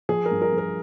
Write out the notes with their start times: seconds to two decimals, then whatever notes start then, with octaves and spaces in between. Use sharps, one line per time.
0.09 F3 G#4
0.26 A#4
0.31 G2
0.42 A#4
0.52 F3
0.58 A#4